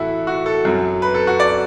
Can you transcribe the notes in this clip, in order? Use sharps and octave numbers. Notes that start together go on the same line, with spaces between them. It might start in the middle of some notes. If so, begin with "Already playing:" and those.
Already playing: A2 E3 E4 F#4 A4
F#4
A4
F#2 F#3
B4
A4
F#4
D5